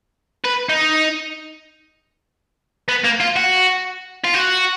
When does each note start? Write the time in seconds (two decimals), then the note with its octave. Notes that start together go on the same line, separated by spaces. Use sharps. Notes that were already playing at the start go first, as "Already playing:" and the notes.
0.45 B4
0.69 D#4
2.88 B3
3.04 A#3
3.20 F4
3.36 F#4
4.25 F4
4.34 F#4